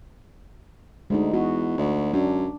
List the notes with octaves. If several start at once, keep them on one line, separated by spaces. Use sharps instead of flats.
D2 G#3 D#4
E2 F#4
D2
F#2 D4